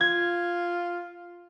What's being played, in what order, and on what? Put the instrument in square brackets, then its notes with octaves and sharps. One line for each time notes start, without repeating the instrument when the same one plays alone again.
[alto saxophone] F4 [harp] G#6